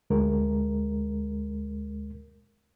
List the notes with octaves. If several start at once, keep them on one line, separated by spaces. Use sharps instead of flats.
D2 G#3 A#4